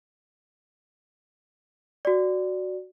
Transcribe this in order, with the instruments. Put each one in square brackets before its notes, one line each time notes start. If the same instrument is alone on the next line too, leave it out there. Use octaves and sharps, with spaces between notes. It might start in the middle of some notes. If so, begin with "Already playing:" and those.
[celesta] F#4 D5